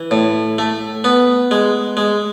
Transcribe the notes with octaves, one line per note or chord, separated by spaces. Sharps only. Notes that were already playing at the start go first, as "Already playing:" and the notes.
Already playing: E3
A2
A3
B3
G#3
G#3